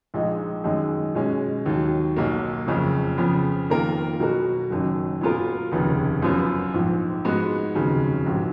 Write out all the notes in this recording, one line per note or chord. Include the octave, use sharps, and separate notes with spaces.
A#1 A#2 G#3 D#4
F#2 D#3 G#3 D#4
B2 G#3 C#4
D#2 D#3 F#3
B1 B2 A#3
F#1 F2 C#3
F2 C#3 F3 B3
F2 D#3 A#3 F4 A#4
B2 F#3 B3 F#4 A#4
F#1 F#2 D#3 F#3
A#2 F#3 B3 F4 A#4
F1 D#2 C#3
F#2 F3 B3 F4
A#1 G#2 F3
G#2 F3 G#3 B3 F#4
F1 D#2 C#3 F#3
A#1 G#2 F#3